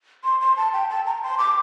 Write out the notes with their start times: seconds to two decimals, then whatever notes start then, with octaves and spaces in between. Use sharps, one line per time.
0.24 C6
0.41 C6
0.57 A5
0.74 G5
0.89 A5
1.06 A#5
1.23 C6
1.39 D6